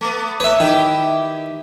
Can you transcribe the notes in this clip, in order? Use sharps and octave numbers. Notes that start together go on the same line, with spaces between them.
A3 B3
A3 B4 C#5 E5
D#3 E4 G4